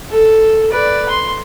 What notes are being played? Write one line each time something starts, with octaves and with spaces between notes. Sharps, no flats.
A4
B4 D5
C6